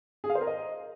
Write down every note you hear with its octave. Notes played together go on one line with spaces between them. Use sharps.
G#4
F5
C5
A#4
D#5